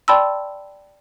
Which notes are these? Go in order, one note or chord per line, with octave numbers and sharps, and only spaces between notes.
D5 G5 A5 B5 C6 E6